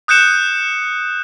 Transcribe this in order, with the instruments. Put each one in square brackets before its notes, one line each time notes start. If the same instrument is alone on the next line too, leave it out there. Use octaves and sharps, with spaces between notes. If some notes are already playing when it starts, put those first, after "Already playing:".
[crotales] D#6 F#6 G6 C#7 E7